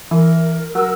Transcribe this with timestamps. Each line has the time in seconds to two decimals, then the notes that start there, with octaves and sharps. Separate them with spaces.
0.11 E3 A#4
0.75 F#3 F#4 A#4 E6